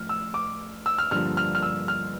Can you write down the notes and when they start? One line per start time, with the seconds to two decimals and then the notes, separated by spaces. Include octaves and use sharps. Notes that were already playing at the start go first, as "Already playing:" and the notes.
Already playing: A2 F3 F6
0.09 E6
0.34 D6
0.86 E6
0.98 F6
1.11 G2 D3 F3 A#3 F6
1.37 F6
1.55 F6
1.62 E6
1.88 F6